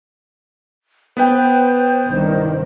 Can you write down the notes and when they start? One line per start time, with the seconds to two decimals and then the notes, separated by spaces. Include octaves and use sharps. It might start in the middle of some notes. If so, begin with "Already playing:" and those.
1.17 B3 B4 C5 G5
2.07 C2 G2 D#3